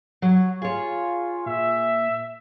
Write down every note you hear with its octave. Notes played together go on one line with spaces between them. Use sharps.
F#3 C#5
F4 G#4 C#5
A#2 E5